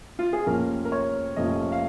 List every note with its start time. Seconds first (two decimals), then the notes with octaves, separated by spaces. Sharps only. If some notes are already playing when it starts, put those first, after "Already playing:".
0.19 F4
0.33 G#4
0.46 F1 F2 F3 A#3 C#4 A#4
0.85 A#4
0.92 C#5
1.36 F1 F2 F3 A#3 C#4 D#5
1.72 F5